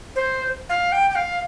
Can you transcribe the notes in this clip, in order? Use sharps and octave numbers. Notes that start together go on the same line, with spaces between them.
C5
F5
G5
G5
F5